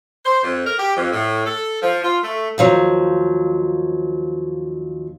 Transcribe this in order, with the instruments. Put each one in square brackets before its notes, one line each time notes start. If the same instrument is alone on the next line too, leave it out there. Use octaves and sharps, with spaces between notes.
[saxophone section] C5
F2
A#4
G4
F2
A2
A4
F3
F4
A3
[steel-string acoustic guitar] D#2 F3 F#3